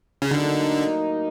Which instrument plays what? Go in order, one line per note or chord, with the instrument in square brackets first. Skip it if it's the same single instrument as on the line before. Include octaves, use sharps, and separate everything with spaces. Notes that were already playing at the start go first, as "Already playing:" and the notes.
[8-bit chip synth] C#3
[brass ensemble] A2 F#3 A#3 D#4 [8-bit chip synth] D3